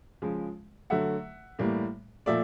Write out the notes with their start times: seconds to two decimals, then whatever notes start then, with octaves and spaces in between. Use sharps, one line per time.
0.22 C#3 F3 G#3
0.90 D3 F#3 A3 E5 F#5
1.59 A2 E3 G3 A#3
2.26 A#2 F3 A3 D5 E5